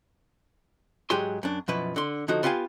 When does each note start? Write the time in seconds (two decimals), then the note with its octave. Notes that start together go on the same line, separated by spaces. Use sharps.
1.10 G#2 F#3 G4 G#4 D5 C6
1.43 F#2 D4
1.68 F#2 B2 F3 E4 B4
1.96 D3 C6
2.28 D3 F3 D#4 F#4
2.43 B3 F4 G4 F5 F#5 G#5